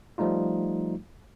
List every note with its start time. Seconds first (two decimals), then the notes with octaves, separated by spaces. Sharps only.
0.18 F3 G3 A3 D#4 F4